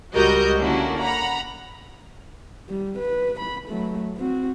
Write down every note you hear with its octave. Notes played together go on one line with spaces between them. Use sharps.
C#2 G3 F#4 A#4 D#5 G6
D3 A#3 C#4 D4 E4 F#4
F#5 A#5 B5
G3
B4
B5
F#3 A3
C4 F#4